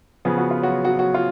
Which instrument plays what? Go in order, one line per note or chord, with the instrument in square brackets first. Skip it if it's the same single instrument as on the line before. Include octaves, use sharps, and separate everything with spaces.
[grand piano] C#3 F3 B3 G#4
F#4
F4
F#3 F#4
F#3 F#4
F#3 F#4
F4